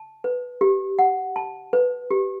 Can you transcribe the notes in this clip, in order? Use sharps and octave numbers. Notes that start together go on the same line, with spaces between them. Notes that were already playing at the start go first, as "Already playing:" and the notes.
Already playing: A5
B4
G4
F#5
A5
B4
G4